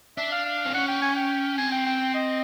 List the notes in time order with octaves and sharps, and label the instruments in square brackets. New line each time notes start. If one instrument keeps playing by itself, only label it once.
[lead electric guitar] D4 [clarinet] E5
[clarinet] F5
F5
[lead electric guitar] C4
[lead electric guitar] C#4 [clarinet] F#5
[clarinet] G5
G#5
G5
[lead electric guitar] C4 [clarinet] G#5
[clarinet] G5
G5
D#5